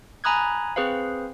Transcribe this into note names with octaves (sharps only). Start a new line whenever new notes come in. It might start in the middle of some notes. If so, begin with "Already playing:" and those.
G#5 A#5 B5 D#6 F#6 G#6
C4 G#4 B4 C5 F5